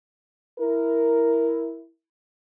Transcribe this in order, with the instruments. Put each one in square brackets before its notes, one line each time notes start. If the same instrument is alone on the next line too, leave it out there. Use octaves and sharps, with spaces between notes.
[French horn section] E4 A#4